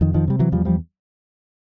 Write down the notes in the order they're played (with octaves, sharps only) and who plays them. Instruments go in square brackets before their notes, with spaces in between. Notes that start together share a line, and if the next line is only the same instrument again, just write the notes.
[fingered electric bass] F2 D#3
D#3 F3
C3 G3
E3 F#3
E2 F3 G3
F3 G3